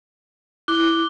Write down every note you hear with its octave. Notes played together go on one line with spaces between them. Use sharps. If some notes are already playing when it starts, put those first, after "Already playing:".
E4 D6 F#6 G7